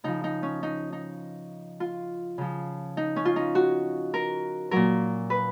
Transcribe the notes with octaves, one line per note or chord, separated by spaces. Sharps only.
C#3 F3 D#4
D#4
C#4
D#4
D#4
F4
C#3 F3
D#4
C#4
F4
D#4
F#4
A#4
A#2 F#3 A#4
B4